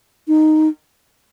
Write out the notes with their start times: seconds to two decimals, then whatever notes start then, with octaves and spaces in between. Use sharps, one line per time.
0.28 D#4